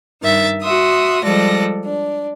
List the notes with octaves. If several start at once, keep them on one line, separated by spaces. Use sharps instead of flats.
G2 D#3 E5 A6
F#4 E5 C6 D#6
F3 G3 G#3 A4 D5 A#6
D4